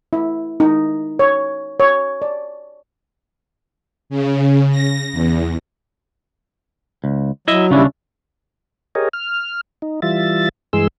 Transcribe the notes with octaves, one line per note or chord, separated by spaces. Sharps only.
E4
D#4
C#5
C#5
D5
C#3
A#6
E2
C#2
F#3 E4 D#5 E5
D#2 C#3 G3 C#4 D4 E4
G4 G#4 A#4 C#5 D#5
F6
D#4
E3 G3 F4 E5 A6
G2 E3 G#3 G#4 C6 E6